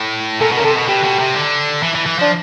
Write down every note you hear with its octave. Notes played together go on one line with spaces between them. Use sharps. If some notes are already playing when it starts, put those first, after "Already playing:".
Already playing: A2
A#2 A4
B2
A#4
C#3
C3 A4
B2
B2 G4
B2
C3
D3
E3
E3
E3
F3 D4